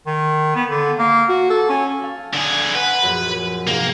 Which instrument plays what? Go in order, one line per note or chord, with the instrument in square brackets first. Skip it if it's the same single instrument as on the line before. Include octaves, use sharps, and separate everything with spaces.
[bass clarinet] D#3
B3
D3
A#3
F#4
A4
C#4
[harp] A4 F5
[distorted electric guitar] D3 G#4
[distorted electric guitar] B4 [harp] F#5 G#5 C6
[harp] A#1 F#2 A#4
[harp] G#2 C3 [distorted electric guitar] A#3